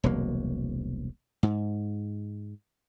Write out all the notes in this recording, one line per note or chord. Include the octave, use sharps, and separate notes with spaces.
E1 C2 F#3 A#3
G#2